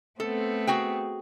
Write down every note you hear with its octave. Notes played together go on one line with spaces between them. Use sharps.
A3 B3 C4 A4
F#4 G#4 G5